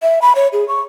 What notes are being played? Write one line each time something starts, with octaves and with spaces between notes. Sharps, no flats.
E5
B5
C#5
G#4
C#6